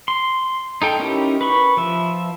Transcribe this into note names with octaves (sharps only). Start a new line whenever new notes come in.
C6
D#4 A4 G5
C#4 D#4 E4 G4 A#4
B4 B5 C#6
F3 E5